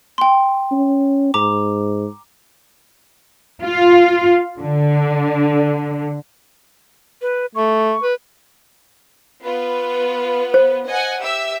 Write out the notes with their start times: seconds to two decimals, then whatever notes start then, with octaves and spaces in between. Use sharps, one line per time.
0.18 G5 C6
0.71 C#4
1.34 G#2 A#5 D6
3.62 F4
4.58 D3
7.22 B4
7.55 A3 C#6
8.03 B4
9.43 B3 F4 B4
10.54 C5
10.86 D#5 F#5 G#5
11.22 G4 E5 E6